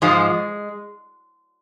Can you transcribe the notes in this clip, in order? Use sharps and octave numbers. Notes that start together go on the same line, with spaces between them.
G#2 F3 G#3